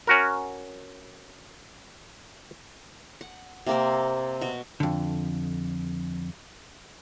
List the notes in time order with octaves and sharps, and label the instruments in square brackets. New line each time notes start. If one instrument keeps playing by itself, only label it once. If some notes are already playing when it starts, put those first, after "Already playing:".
[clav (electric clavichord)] C#4 F#4 A#4
[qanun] F#5
C3 A#3 C4
B2 F#4
[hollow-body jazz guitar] F2 D3